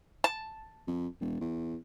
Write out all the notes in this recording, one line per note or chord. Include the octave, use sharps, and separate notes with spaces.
A5
F2
E1
E2